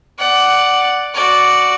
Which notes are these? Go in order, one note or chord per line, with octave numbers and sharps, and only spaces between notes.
D5 F#5
F#4 D5